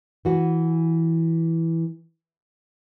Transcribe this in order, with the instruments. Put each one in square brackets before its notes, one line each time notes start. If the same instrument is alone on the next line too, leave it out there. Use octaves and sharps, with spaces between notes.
[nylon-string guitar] E3 F#4